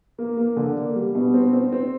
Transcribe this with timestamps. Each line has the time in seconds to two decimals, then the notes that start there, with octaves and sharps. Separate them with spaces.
0.18 A#3
0.37 A#3
0.57 D3
0.76 A#3
0.96 G3
1.15 B2
1.34 C4
1.53 C4
1.72 C4